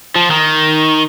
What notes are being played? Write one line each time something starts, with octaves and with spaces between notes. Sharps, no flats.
F3
D#3